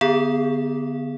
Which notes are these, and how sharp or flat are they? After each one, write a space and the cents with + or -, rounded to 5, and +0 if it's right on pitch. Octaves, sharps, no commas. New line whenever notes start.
D3 +5 B3 +0 G#4 +0